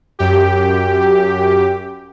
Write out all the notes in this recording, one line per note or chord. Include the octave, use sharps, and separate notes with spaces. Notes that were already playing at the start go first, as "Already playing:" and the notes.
F#2 G4